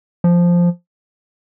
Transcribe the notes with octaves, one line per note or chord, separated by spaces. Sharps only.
F3